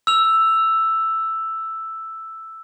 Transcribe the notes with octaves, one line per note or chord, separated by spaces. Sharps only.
E6 F7